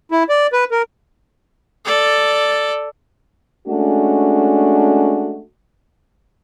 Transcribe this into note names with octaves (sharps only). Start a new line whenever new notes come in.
E4
D5
B4
A#4
A4 D5
G#3 A3 C#4 D4 F#4